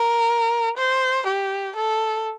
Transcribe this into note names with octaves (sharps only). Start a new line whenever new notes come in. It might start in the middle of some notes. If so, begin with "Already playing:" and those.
Already playing: A#4
C5
G4
A4